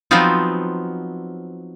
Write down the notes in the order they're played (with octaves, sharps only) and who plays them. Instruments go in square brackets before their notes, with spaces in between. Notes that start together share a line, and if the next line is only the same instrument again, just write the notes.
[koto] F3 F#3 B3 C4 D#4 F4